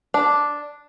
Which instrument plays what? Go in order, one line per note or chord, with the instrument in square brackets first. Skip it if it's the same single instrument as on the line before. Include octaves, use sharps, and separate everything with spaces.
[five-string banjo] D4